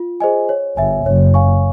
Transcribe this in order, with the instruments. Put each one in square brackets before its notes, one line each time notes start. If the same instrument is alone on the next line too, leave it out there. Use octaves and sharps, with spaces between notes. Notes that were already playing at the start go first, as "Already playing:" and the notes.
Already playing: [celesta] F4
G#4 C5 D#5 G#5
C#5
[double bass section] G1 G2 [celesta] E5 G#5
[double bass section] F#1 F#2 [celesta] C#5
[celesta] F5 G#5 C#6